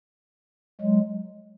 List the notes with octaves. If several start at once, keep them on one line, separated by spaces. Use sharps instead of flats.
F#3 G#3